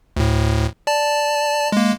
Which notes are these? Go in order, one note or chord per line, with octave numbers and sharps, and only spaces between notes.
D2 A2
D5 A5
G#3 A#3